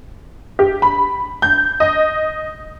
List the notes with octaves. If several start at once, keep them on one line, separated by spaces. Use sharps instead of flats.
G4
B5
G6
D#5